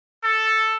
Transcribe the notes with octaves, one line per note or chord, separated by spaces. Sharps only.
A4